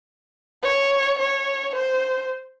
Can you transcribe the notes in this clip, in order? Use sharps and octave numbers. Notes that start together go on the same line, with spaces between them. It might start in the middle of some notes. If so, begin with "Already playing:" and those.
C#5
C#5
C5